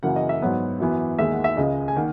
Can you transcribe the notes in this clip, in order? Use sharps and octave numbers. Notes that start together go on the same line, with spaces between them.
F#2 C#3 E3 A#3 F#5
D#5
E5
G#2 F#3 B3 F#5
F#2 E3 B3
D#2 D#3 G#3 E5
F#5
E5
C#2 C#3 G#3 D#5
G#5
D#3 A#3 F#5